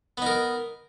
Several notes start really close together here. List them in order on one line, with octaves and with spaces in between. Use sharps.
B3 D#4 A#4